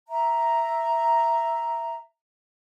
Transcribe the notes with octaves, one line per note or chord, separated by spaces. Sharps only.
E5 A#5